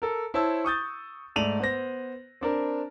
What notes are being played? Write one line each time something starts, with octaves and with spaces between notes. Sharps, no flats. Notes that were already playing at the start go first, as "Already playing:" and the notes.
A4 A#4
E4 C5 C#5 A5 E6
C#6 D#6 G6 A6
G#2 A3 D5 D#7 F7 F#7
B3 C5 A#6
C4 D4 A#4